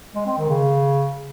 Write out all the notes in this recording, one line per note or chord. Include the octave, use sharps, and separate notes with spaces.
G#3
C4
D#3
C#3